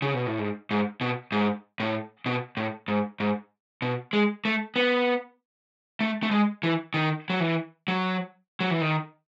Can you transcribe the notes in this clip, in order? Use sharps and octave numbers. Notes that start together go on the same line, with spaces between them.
C#3
B2
A2
G#2
G#2
B2
G#2
A2
B2
A2
G#2
G#2
B2
G#3
A3
B3
A3
A3
G#3
E3
D#3
F#3
E3
F#3
F#3
E3
D#3